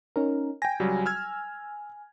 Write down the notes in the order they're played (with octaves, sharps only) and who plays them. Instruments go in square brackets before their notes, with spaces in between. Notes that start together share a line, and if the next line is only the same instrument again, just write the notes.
[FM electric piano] C#4 D#4 A#4
[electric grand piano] G5 A#6 [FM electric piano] G#5
[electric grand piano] C#2 F#3 G3
E6 F6 G#6